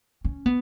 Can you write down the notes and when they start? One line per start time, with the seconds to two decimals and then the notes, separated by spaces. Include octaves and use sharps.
0.24 C#4
0.46 B3